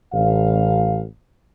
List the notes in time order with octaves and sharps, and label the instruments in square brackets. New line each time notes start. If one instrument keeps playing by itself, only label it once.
[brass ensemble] A1 F5